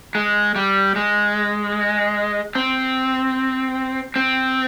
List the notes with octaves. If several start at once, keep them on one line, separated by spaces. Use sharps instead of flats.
G#3
G3
G#3
C4
C4